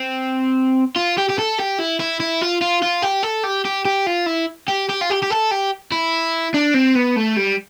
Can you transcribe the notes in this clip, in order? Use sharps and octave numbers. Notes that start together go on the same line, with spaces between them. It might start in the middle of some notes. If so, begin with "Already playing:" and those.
Already playing: C4
F4
G4
G4
A4
G4
E4
E4
E4
F4
F4
F4
G4
A4
G4
G4
G4
F4
E4
G4
G4
F4
G4
G4
A4
G4
E4
D4
C4
B3
A3
G3